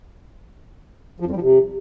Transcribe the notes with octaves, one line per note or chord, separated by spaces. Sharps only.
F3
F2
G3
F3
C3